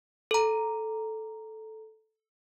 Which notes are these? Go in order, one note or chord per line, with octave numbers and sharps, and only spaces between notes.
A4 A#5